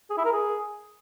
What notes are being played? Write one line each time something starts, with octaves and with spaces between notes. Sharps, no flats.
G#4
E4
A#4
G#4